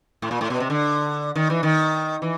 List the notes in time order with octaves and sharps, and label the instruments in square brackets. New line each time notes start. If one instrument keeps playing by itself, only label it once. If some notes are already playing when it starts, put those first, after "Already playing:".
[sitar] A2
A#2
A2
B2
C3
D3
D#3
E3
D#3
E3